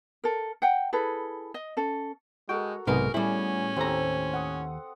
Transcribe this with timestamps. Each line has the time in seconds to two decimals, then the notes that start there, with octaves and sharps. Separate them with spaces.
0.24 A4 A#4
0.62 F#5 G5
0.93 E4 G#4 A4 B4
1.54 D#5
1.77 C#4 A4
2.49 G#3 F#4 A4 A#4 G5
2.87 B1 G#2 C3 B3 D#4 G#4 A#4 B4
3.14 A2 G3 C#4 E4 G#5
3.76 D#2 C4 G4 A4 A#5
4.34 F#5 D#6